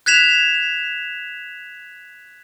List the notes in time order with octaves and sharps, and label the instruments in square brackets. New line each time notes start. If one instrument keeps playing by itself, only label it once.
[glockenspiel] F#6 G#6 B6 E7 F7